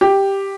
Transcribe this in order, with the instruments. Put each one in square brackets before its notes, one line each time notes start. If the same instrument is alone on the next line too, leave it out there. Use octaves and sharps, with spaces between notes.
[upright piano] G4